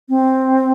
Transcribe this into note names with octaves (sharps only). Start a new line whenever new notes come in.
C4